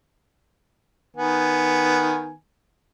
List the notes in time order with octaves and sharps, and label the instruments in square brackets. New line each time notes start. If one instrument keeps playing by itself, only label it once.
[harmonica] D#3 B3 G#5